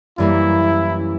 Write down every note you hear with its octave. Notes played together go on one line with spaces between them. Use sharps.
F#2 E3 G3 A#3 E4